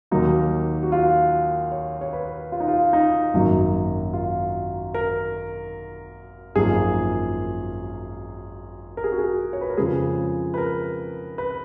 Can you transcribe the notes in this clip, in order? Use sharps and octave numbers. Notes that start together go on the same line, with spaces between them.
D#2 D#3 F#3 A#3 D#4
F#4
F4
C#5
C#5
B4
F4
D#4
F4
D#4
G#1 F#2 D#3 F#3 A#3
F4
A#4
G#1 F#2 F3 A#3 G#4
A#4
G#4
F#4
G#4
C#5
B4
A#4
F2 C#3 F3 G#3 G#4
B4
A#4
B4